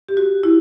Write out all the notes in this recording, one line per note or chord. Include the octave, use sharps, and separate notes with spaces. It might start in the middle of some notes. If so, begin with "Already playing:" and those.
G4
F#4
E4